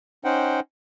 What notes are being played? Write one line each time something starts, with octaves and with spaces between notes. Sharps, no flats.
C#4 D#4 C5 F#5 G5